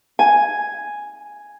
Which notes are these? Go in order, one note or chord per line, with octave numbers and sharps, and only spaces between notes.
G#5